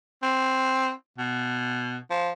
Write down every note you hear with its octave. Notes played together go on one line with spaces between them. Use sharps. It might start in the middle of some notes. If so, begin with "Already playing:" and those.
C4
B2
F3